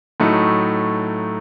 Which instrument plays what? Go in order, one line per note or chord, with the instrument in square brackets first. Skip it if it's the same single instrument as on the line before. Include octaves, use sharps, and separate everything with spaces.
[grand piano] A2 F#3 A3 D#4